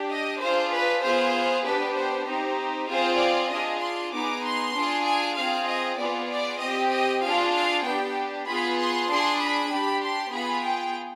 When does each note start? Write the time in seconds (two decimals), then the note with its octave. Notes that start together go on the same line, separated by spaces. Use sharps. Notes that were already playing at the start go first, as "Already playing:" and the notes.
Already playing: D4 G4
0.12 D#5
0.42 D4 F4 G#4 C5
0.74 B4
1.04 B3 F4 G#4 C5
1.66 B3 D4 G4 B4
1.97 C5
2.28 C4 D#4 G4 C5
2.90 C4 F4 G#4 C5
3.21 D5
3.52 D4 F4 G#4 D#5
3.83 C6
4.14 B3 D#4 G#4 D6
4.45 C6
4.76 D4 F4 G#4
5.07 G#5
5.37 C4 F4 G#4 F5
5.69 D#5
5.99 B3 F4 G#4 D5
6.31 D5
6.61 C4 G4 D#5
6.93 D#5
7.24 D4 F4 G#4 F5
7.55 F5
7.86 B3 D4 G4 G5
8.47 B3 F4 G#4 B5
8.79 C6
9.09 D4 G#4 C6
9.41 B5
9.71 D4 G4
10.02 C6
10.33 B3 F4 G#4 B5
10.64 G5